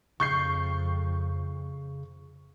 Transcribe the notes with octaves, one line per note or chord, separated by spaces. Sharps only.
F2 C#3 C#6 G6 C7